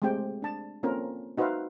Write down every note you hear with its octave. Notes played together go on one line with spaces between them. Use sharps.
G#3 A3 C4 G4 G5
D4 A5
A#3 C4 C#4 F4 A4 A#4
D#4 F#4 B4 C5 E5 F5